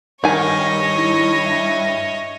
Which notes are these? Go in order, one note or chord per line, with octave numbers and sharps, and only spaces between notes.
G2 D#3 C#5 D#5 G#5
E4
E5